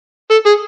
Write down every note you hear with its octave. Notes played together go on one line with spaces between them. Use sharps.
A4
G#4